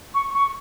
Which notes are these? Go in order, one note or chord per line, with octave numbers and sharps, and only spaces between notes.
C#6
C#6